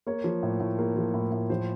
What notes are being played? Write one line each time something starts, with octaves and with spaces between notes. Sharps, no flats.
A#3 C#5
F3
A2
A2
A#3
F3
A2
A2
F3 C5